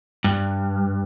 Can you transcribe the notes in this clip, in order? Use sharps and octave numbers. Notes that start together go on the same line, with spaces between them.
G2